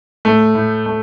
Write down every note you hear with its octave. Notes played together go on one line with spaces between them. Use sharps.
A2 A3
A2
A3